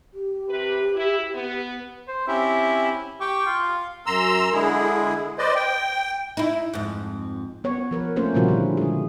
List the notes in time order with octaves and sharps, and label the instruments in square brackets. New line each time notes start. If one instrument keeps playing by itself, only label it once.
[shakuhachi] G4
[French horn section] C3 B4
E4
B3
[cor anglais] C5
[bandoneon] C4 C#4 G4 [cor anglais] E4
[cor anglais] G4 [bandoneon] G5 C#6
[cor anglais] F4
[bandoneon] F5
[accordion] F#2 A#5 C6 E6
D3 G#3 E4 G#4
B4 C5 D5 D#5
G5
[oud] D#4 E4
F2 G#2
[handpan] B3 C#5
F3 A#4 B4
A3 A#3 C#4 C5
A#2 C#3 F3 G3 E4 F#4
D3 C#4
G#3 G#4